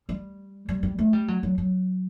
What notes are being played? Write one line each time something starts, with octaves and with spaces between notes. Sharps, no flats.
G3
G3
G3
A3
G3
F#3
F#3
F#3